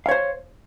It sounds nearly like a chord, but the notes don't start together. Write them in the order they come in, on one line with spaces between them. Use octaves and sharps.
F5 C#5 C5